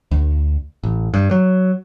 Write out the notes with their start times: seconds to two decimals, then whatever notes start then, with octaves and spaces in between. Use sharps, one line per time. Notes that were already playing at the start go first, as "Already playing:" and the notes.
0.11 D2
0.83 A1
1.14 G2
1.31 F#3